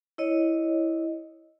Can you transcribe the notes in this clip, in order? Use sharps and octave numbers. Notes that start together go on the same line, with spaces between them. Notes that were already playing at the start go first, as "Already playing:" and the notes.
E4 C#5 D#5